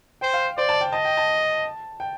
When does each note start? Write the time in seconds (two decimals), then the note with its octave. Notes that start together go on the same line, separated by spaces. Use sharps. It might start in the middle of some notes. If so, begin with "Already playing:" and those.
0.21 C5 G5
0.34 F5
0.57 C5 D5
0.69 A5
0.81 G5
0.93 D#5 A5
1.05 G5
1.17 A5
2.00 G5